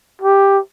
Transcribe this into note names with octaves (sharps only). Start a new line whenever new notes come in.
G4